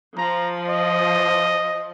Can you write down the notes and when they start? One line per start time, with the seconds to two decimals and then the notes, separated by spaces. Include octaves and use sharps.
0.17 F3 A#5
0.69 D#5